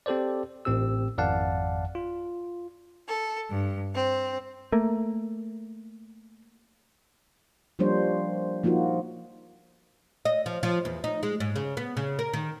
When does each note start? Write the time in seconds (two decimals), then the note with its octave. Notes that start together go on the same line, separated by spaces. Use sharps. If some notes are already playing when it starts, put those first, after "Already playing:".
0.06 C4 G4 A4 C5 D5
0.65 A1 A2 C4 G4 E6
1.18 G#1 F2 D5 F5 F#5 A5
1.95 F4
3.07 A4
3.50 G2
3.94 C4
4.72 A3 A#3
7.79 F3 G3 A#3 D4 C5 C#5
8.63 F3 A#3 D#4 F4 F#4
10.25 D#5
10.46 F3
10.63 F3
10.85 E2
11.04 D#4
11.23 G#3
11.40 G#2
11.56 C#3
11.77 B3
11.97 C#3
12.19 A#4
12.34 D#3